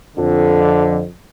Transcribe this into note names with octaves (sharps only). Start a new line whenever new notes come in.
F2 D3